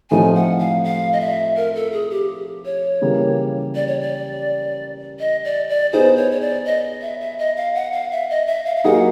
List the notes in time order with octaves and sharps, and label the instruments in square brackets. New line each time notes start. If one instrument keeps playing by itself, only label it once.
[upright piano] A2 F3 A3 C4 D#4 [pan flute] G#5
[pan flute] F#5
F5
F5
D#5
E5
A#4
A4
G#4
G4
C#5
[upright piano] C#3 E3 G3 A#3
[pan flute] D5
C#5
D5
D#5
D5
D5
[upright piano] B3 D#4 G#4 [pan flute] C5
[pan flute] C#5
C#5
D5
D#5
E5
E5
D#5
F5
F#5
F5
E5
D#5
E5
F5
F5
[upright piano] F#3 A#3 D#4 G#4 [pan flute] F#5